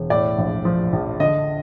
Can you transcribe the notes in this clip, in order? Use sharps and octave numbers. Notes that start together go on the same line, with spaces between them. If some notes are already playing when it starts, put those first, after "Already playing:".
Already playing: E1
A2 D5
A#1
F3
A#1
D3 D#5